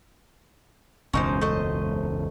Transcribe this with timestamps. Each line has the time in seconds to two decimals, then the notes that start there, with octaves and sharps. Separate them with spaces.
1.13 E1 C#2 F#2 C#4 D#4 C5
1.41 A3 C5 D#5